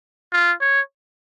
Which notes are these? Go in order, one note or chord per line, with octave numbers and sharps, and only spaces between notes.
F4
C#5